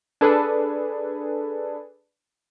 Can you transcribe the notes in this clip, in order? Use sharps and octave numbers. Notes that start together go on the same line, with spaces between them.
D4 G#4 A4 B4 G#5